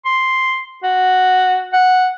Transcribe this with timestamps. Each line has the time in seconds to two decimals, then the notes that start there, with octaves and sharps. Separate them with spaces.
0.05 C6
0.84 F#4
1.73 F#5